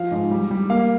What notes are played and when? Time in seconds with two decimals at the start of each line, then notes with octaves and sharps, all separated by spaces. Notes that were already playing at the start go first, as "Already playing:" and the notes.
Already playing: F3 F5
0.11 G#2
0.31 G3
0.51 G3
0.70 A#3 F5